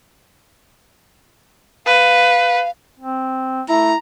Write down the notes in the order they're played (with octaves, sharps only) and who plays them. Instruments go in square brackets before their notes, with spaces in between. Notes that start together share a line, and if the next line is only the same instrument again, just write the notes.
[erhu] B4 [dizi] F5
[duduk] C4
[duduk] A3 [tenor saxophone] E4 [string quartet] A#5